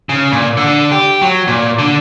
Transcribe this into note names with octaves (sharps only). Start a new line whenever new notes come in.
C#3
A#2
D3
G4
F#3
A#2
D3